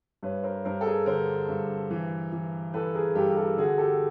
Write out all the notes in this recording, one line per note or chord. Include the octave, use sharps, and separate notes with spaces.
G2 B4 C#5
A#4 C5
G2 A#4 C5
A4
G#4 A#4
D3 A#4 C5
G2
E3
E3
E3 A4 B4
G#4 A#4
G2 G4 A4
A#4
G4 A4
D3 F#4 G#4
G4 A4